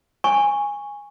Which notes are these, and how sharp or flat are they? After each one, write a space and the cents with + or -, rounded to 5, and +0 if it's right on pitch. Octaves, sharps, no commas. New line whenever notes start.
G#5 -10 C#6 +0